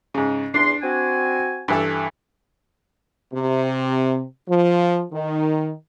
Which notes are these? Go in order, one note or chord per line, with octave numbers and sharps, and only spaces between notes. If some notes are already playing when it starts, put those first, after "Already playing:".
G#2 C#3
E2 D4 C6
C4 F#4 G#5
G2 E3 A4
C3
F3
D#3